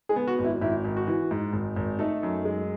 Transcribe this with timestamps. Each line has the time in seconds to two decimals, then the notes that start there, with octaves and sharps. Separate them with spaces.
0.09 G#3 G#4
0.16 B3
0.27 F#4
0.39 G#1
0.44 E4
0.61 G#1 E4
0.85 G#1
0.97 F#4
1.07 E3
1.31 G#2
1.53 G#1
1.76 G#1
1.99 A3 D#4 A4
2.23 F#2
2.45 G#3